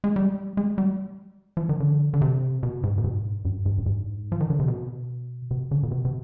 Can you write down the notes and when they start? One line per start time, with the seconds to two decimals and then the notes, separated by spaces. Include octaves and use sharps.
0.04 G#3
0.16 G3
0.57 G#3
0.78 G3
1.57 F3
1.69 D#3
1.80 D3
2.14 D3
2.22 C3
2.63 B2
2.83 G#2
2.98 B2
3.04 G#2
3.45 G2
3.66 G#2
3.78 G2
3.86 G#2
4.32 F3
4.40 D#3
4.50 D3
4.60 C3
4.68 B2
5.51 C3
5.71 D3
5.83 B2
5.91 C3
6.05 C3